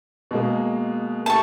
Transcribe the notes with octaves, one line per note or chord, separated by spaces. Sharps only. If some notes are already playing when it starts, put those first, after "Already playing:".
B2 G#3 A#3
A3 G4 A5 C#6